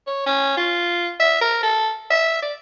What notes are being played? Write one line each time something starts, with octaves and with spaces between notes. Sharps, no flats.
C#5
C#4
F4
E5
A#4
A4
E5
D5